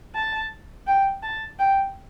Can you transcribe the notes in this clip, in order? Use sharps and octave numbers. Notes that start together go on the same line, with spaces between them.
A5
G5
A5
G5